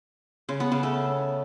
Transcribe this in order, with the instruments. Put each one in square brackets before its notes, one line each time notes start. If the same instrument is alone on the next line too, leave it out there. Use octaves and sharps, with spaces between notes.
[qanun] C#3
B3
C#3
A3